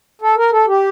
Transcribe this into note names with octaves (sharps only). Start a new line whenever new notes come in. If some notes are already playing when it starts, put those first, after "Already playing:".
A4
A#4
A4
G4